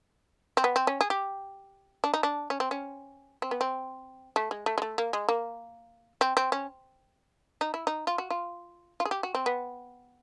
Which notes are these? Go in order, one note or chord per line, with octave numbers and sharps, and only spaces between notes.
C4
B3
C4
C#4
G#4
G4
D4
D#4
D4
C#4
C4
C#4
C4
B3
C4
A3
G#3
A3
G#3
A3
A#3
G#3
A#3
C4
C4
C#4
D#4
E4
D#4
F4
F#4
F4
F4
G#4
G4
F#4
C4
B3